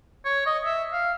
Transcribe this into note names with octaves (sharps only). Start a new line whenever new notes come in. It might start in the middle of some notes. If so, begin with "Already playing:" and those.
C#5
D#5
E5
F5